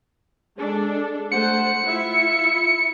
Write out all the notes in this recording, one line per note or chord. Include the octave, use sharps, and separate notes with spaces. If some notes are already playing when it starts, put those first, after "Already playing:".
G#3 D4 A4
A3 C5 F#5 C#7
E4 F4 E5